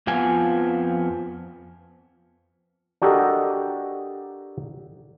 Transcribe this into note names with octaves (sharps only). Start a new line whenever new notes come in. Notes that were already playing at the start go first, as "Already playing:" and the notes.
F2 F3 B3 G#5
D4 F#4 G4 A4 A#4 D#5